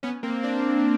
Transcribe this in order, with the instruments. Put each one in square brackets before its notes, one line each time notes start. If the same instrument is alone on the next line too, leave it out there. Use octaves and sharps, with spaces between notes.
[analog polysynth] B3 C#4
A#3 C4
C4 D4